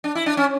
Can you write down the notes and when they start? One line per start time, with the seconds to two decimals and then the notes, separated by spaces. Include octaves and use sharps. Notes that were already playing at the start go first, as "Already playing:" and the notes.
0.04 D4
0.15 E4
0.26 D4
0.37 C#4